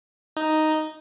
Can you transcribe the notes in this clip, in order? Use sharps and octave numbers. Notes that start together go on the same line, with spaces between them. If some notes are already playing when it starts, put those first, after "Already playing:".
D#4